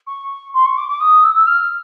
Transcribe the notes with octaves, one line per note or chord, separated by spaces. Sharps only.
C#6
C6
C#6
D6
D6
D#6
E6
E6
F6